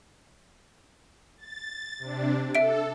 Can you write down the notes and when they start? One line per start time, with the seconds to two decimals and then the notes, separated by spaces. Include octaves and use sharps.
1.38 A6
1.99 C3 D4
2.55 A4 E5 D7